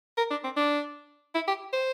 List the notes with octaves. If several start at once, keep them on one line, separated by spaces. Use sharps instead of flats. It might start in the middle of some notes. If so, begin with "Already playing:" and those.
A#4
D4
C4
D4
E4
G4
C5